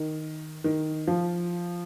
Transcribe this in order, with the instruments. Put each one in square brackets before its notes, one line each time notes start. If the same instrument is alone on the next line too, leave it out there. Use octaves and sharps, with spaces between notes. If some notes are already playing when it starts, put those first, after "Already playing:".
Already playing: [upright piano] D#3
D#3
F3